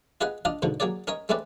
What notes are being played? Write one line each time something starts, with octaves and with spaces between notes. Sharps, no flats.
F4 G#4 B4 D#5 F5 F#5
D4 F4 D#5 F5
G#2 B2 D3 F3
F#3 A#3 G#4 C#5 D5
C#4 A#4 C#5 D#5
G#3 A3 C4 C#4 B4 D5